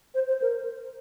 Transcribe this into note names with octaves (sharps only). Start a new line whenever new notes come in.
C5
C5
A#4